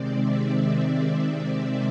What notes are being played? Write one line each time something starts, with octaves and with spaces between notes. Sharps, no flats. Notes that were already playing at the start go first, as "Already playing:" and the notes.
Already playing: C3 D#3 G#3 C4 D5
E5
E5